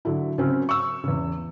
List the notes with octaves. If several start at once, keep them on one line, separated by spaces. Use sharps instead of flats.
D3 F#3 E4
C#3 F#3 C4 C#4
C#6 E6
E2 C#3